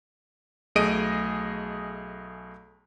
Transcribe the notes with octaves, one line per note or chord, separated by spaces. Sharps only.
B1 A3 G#4 D#5 D7 D#7